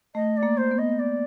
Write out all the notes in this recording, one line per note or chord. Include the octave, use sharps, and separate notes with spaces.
A3 D#5
D5
A#3
C5
B3
D#5
D5